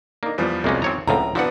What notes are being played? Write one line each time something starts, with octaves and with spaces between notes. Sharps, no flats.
A#3 D4 D#4
E2 F3 G3 D4 F4 B4
C2 G#3 A#3 C#4 D5 F5
G#1 C4 C#5 A#5
C#2 A2 D3 F3 C4 A#5
F3 B3 D4 E4 F#4 F#5